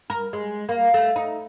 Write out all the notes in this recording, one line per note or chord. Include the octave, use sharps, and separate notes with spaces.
A#4
G#3
A#3
A3
D#4